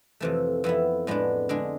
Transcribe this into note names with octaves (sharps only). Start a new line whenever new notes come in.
F2 C3 E3 A3
F2 E3 B3 E4
A2 G#3 B3 D4
D3 G#3 D4 G#4